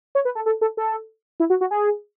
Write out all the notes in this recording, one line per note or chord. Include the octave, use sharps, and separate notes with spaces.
C#5
B4
A4
A4
A4
A4
E4
F#4
F#4
G#4